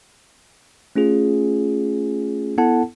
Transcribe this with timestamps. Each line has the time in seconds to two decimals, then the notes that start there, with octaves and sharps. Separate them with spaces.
0.96 A3 C#4 F4 G#4
2.58 B3 E4 A4 F#5 A5